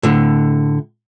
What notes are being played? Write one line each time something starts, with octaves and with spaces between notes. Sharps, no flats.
A2 D3